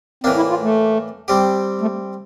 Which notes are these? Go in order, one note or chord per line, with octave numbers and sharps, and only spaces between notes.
A2 E3 A#3 C4 D4
E4
F4
A3
G3 C4 G4
A3